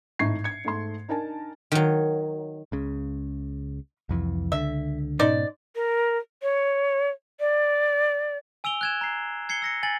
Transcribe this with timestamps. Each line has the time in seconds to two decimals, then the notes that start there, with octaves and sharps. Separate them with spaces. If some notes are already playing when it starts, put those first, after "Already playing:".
0.19 G#1 A2 D#4 C#6 G#6 C7
0.44 G#6 C#7
0.64 G#2 A3 C6
1.08 D4 D#4 A#4 G#5 A5
1.72 D#3 F#3
2.72 C#2 C#3
4.09 C2 F2 E3
4.52 C#2 D3 E5
5.20 G#2 B2 C#4 D#4 C5 D5
5.75 A#4
6.42 C#5
7.40 D5
8.64 G#5 E6 D7 F7 G7
8.81 F#6 G#6 E7
9.01 A#5 C7
9.49 G#6 C7 C#7 G7
9.62 E6 A#6 C#7
9.83 G#5 A6 F#7